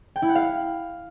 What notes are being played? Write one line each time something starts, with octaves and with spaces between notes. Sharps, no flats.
G5
E4
F#5
F5